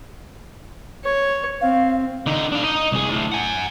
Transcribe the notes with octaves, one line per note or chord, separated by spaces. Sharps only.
C#5
C4 F5
D3 D#4
D4 F5
D#4 D#5
C2 G#4
D2 A2
F#5 G#5